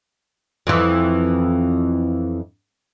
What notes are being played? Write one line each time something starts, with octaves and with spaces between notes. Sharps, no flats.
F2 E3